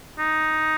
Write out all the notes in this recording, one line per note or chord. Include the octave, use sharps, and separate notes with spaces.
D#4